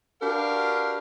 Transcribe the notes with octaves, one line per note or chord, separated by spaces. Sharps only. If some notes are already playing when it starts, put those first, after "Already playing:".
D4 F#4 G4 A#4 B4 F5